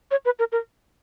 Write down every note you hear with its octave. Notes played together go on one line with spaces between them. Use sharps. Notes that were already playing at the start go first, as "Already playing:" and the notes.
C#5
B4
A#4
A#4